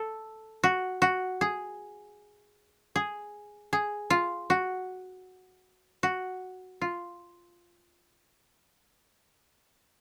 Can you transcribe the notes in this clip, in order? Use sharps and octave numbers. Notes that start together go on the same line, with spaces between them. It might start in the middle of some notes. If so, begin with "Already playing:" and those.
Already playing: A4
F#4
F#4
G#4
G#4
G#4
F4
F#4
F#4
F4